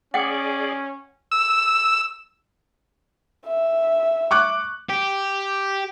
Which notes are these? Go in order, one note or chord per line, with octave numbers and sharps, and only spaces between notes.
C#4 G#4 D5 F#5 G5
E6
E5
C#6 D6 F#6
G4